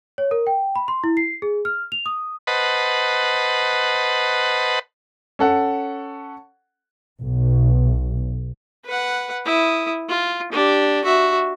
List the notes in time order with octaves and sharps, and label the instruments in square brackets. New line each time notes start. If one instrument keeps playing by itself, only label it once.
[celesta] C#5
A#4
G5
B5
C6
E4
C7
G#4
F6
F7
D#6
[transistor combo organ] B4 C5 D#5 F#5 A5 B5
[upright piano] C#4 A4 F#5
[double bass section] B1
[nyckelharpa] B4 F#5
E4 D#6
F4
D4 G4
F#4 E5